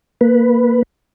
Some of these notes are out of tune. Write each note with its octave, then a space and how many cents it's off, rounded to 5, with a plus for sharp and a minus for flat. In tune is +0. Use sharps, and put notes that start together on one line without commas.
A#3 +0 B4 +0